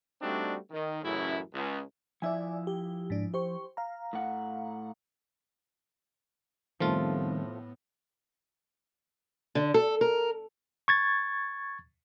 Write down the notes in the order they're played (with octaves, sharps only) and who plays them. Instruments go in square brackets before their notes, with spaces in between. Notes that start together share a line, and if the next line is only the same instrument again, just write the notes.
[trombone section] G3 A3 C4 D4 D#4 F#4
D#3
A1 F#2 A2 C#3 E4
C#2
[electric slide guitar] F3 E4 [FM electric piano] D5 E5 G#5
[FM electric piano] G4
G#2 D4
G4 C5 C#6
F5 A#5
[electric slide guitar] A2 F#5
[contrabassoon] F1 [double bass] A2 B3 [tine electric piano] D#3 G3 [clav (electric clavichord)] F3 A3 F4
[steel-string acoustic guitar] D3
A4
A#4
[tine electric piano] C#6 G#6 A6